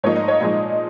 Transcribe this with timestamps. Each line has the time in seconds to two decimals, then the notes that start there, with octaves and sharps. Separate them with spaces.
0.03 G#2 F3 A#3 D#4 C#5
0.16 D#5
0.28 C#5
0.40 A#2 F3 G#3 D#4 D#5